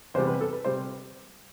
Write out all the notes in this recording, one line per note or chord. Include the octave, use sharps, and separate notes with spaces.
E2 C3 G3 C5
B4
A4
B4
C3 G3 C5